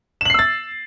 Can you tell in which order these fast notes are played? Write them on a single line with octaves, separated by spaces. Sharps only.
E7 F#7 C7 E6 A6